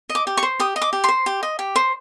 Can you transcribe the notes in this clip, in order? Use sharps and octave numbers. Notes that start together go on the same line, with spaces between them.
D#5
D6
G4
C#6
C5
G4 D#6
D#5
D6
G4
C5 C6
G4
D#5
G4
C5